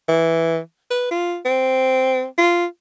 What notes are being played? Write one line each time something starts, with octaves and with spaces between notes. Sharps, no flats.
E3
B4
F4
C4
F4